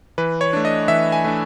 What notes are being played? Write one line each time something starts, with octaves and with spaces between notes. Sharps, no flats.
E3 B4
C#5
A3 D4
D#5
E3 E5
G#5
A3 D4